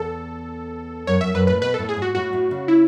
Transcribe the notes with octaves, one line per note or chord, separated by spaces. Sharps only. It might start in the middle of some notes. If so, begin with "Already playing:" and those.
Already playing: E2 A4
F#2 C#5
F#2 E5
F#2 B4
A2 B4
B2 B4
A4
A2
G#4
G#2
F#4
A2 F#4
A2
C#3
E4